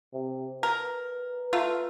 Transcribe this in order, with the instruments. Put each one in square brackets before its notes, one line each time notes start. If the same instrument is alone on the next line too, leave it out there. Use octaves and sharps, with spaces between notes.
[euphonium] C3
[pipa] A#4 [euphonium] B4
[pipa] A3 F4 A#4